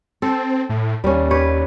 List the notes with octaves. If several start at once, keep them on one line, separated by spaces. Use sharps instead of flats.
C4 A4
A2
D#2 G3 C#4
G4 B4 C#5